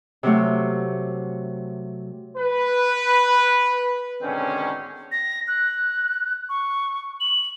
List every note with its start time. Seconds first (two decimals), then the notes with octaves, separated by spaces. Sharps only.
0.23 C3 F#3 A3
2.38 B4
4.23 G#2 B2 D3 D#3 C4 C#4
5.12 A#6
5.48 F#6
6.49 C#6
7.21 F#7